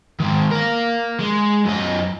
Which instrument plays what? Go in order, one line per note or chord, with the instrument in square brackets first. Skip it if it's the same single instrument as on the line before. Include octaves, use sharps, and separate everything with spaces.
[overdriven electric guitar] D#3 G#3
A#4 F5
G#3
F#2 D#5